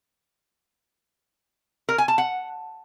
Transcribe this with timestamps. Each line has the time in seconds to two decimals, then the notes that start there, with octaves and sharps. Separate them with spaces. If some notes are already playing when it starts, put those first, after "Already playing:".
1.89 A#4
1.98 G#5
2.08 A5
2.18 F#5